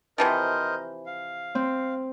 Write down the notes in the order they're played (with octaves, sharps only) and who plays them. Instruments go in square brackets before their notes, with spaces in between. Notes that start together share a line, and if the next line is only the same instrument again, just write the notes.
[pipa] C3 E3 F3 [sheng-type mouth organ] A#4 C5 D#5
[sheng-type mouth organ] F5
[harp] C4